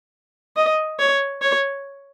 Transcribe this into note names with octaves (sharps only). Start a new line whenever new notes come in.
D#5
C#5
C#5